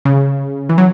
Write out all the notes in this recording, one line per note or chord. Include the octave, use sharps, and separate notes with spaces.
C#3
E3
F#3